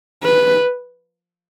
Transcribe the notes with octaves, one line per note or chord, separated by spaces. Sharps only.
B4